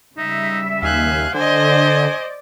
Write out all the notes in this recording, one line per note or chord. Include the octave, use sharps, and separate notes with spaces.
C#3 G3 D#4 E5
D#2 F5 G#5 F#6
D3 C5 D5 D#5 G#5